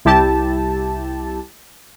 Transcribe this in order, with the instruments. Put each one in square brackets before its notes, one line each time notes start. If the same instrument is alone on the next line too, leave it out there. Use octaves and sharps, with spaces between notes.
[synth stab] C2 E4 G4 A5